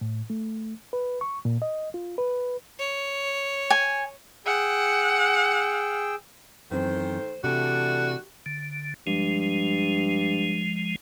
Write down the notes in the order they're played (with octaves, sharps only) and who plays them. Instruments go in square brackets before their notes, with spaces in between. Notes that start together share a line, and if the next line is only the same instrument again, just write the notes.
[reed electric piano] A2
A3
B4
C#6
A#2
D#5
F4
B4
[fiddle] C#5
[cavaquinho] G#5
[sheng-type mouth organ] G#4 G5 E6 [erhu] F#5
[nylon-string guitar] F#2 E3 C4 [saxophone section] D#3 A3 C5
[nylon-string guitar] C3 [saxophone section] E3 A3 D4 [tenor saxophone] F#4
[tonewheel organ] D3
[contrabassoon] G2 [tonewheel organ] F3 G#3